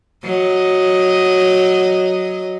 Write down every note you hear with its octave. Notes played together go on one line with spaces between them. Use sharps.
F#3 D#5